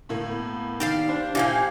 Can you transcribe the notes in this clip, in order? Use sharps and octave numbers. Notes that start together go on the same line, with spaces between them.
A2 D3 A#3
B3
D#3 G4 D5 F5
D4 C5
A#2 F3 E4 G4 F5 G#5